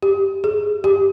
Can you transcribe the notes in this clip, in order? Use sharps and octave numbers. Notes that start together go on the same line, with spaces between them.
G4
G#4
G4